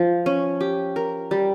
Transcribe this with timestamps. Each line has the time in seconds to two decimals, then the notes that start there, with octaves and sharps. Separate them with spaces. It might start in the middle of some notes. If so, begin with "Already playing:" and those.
Already playing: F3
0.26 C#4
0.61 G4
0.96 A#4
1.31 G3